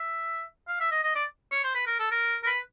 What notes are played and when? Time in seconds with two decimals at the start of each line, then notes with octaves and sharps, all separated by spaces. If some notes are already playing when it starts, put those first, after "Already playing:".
Already playing: E5
0.68 F5
0.80 E5
0.91 D#5
1.03 D#5
1.15 D5
1.52 C#5
1.63 C5
1.75 B4
1.87 A#4
1.99 A4
2.11 A#4
2.43 A#4
2.47 B4